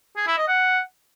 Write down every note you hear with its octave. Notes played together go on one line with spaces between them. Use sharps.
G#4
E4
D#5
F#5